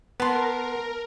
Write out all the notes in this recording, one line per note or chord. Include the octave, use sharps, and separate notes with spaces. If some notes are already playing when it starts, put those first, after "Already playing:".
B3 A#4 A5 C6